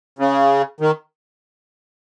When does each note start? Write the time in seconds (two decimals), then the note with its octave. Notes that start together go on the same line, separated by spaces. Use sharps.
0.19 C#3
0.80 D#3